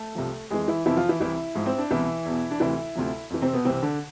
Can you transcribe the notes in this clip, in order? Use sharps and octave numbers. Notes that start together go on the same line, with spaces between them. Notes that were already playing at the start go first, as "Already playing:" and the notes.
Already playing: A3 A4
C2 C3 F3
F2 E3 G#3 G#4
E3 E4
F2 C3 E3 F3 E4
F3 F4
E3 E4
C2 C3 E3 E4
G#2 F3
C4
D4
C2 B2 E3 E4
E2 B2
D4
D2 C3 E3 E4
D2 C3 F3
F2 E3
C3 C4
B2 B3
C2 C3 E3 C4
D3 D4